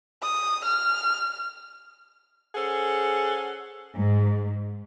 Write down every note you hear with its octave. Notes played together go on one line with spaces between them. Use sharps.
D#6
F6
C#4 G#4 A4 C5 F#5
G#2